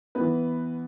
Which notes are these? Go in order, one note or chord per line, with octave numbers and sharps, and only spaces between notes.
E3 B3 B4